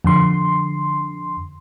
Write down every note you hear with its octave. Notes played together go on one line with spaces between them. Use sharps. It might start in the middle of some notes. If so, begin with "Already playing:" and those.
F2 D3 C6